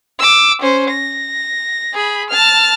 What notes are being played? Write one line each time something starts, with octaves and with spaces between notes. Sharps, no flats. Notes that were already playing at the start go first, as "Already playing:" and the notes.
D6 E6
C#4 C5
A#6
G#4 B5
A5 F6